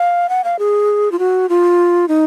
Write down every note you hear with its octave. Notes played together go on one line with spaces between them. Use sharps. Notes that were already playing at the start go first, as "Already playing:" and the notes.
Already playing: F5
F#5
F5
G#4
F4
F#4
F4
D#4